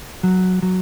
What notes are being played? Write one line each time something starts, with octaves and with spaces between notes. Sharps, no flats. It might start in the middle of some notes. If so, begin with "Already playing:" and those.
F#3
F#3